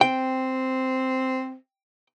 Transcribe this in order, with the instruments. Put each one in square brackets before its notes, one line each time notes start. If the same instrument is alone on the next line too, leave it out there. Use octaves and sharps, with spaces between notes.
[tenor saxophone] C4 [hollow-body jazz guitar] G5